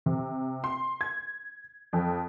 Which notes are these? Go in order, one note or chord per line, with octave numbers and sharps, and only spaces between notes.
C3
C6
G#6
F2